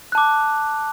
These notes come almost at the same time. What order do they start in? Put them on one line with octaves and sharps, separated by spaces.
F#6 A5 D6